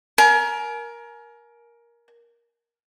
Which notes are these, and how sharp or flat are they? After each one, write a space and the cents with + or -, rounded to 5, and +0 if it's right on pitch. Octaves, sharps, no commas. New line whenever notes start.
A#4 +15 G#5 +35